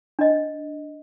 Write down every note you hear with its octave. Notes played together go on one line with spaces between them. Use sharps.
D4 D#5